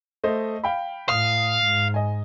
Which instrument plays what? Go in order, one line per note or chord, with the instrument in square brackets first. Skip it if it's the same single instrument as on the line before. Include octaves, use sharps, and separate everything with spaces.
[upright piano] A3 C5 D#5
F5 G5 B5
[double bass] A2 [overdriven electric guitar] F5 [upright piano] D#6
[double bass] G#2
[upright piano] D#5 G#5